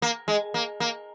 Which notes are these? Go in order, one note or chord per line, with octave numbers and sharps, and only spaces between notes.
A#3
G#3
A#3
A#3